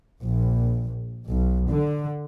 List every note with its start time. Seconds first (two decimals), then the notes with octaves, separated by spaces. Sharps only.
0.22 A#1
1.28 B1
1.69 D3